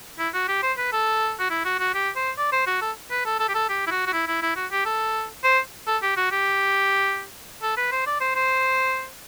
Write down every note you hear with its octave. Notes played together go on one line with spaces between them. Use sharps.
E4
F#4
G4
C5
B4
A4
F#4
E4
F#4
F#4
G4
C5
D5
C5
F#4
A4
B4
A4
A4
G4
A4
G4
E4
F#4
F#4
E4
E4
E4
F#4
G4
A4
C5
A4
G4
F#4
G4
A4
B4
C5
D5
C5
C5